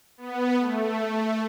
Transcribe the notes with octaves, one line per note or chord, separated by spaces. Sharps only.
B3
A3